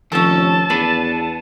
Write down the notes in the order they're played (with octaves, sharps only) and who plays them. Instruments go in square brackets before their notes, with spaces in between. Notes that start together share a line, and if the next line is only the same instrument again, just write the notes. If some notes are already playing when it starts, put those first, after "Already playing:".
[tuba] F1 [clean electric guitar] D#3 F3 [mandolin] C#4 A4 [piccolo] A5
[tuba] E2 [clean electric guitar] B3 B4 B5 [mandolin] D4